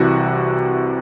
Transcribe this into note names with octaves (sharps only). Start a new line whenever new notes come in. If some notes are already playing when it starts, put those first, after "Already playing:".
Already playing: C2 C3 E3 F#4